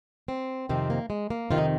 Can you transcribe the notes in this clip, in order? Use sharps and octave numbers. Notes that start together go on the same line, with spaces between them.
C4
F2 C3 D#3 C4
A#3
G#3
A#3
F2 C3 D#3 F4
D#4